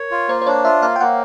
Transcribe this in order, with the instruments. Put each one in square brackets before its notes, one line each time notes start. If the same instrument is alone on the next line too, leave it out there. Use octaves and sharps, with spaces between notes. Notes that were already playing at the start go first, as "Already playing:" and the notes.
Already playing: [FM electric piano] A#4 [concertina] C#5
[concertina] F4
[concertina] A#3 [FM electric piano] C5
[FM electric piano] C5
[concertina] D4 [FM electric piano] C#5
[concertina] F4 [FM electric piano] E5
[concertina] A#3 [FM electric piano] F5
[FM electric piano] G5
[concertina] A#3 [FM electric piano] F#5